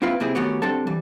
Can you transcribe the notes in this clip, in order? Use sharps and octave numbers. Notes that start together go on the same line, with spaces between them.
A#3 C4 E4 F4 B4 G5
C3 A#3 C4 E4 G#4
D#3 A3 B3 C#4 F#4 G4
D3 G3 C4 A4 A5
E3 G3